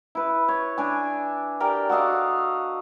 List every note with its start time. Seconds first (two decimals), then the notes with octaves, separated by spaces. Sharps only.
0.15 E4 B4
0.48 C#5
0.78 D4 G#5
1.60 G4 A#4 D5 G5
1.89 F#4 A4 D#5 F5